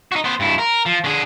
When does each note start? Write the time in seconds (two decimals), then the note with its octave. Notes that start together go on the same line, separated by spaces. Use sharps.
0.12 D#4 F#4
0.24 B3 C5
0.40 G2 E4
0.59 A#4
0.86 F3
1.04 D3 G#4